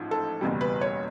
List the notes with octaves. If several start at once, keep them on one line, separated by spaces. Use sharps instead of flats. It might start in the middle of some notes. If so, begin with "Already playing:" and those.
Already playing: A1 G#2 F3
A4
F#1 E2 B2 G3
B4
C#5